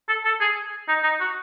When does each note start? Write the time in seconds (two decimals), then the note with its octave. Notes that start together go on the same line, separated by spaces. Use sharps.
0.08 A4
0.25 A4
0.41 G#4
0.88 D#4
1.03 D#4
1.20 F#4